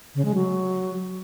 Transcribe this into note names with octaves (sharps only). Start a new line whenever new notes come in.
C#3
G#3
F#3